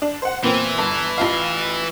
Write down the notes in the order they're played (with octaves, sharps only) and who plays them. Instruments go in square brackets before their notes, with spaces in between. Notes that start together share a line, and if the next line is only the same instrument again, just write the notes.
[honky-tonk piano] D4
C5 F#5
[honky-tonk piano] A#2 B3 C4 [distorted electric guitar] E3
[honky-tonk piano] G1
A1 F4 F5